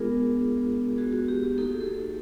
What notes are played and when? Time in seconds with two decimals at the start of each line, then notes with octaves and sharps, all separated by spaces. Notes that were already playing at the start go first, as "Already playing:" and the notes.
Already playing: G#3 B3 D4 F4 G#4 A#4
0.98 F#4 G#4
1.13 F#4
1.28 G4
1.43 G4
1.57 A#3 D#4 F#4 A4
1.70 G#4
1.81 G4 A4